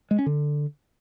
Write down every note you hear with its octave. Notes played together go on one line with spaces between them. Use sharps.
G#3
C#4
D3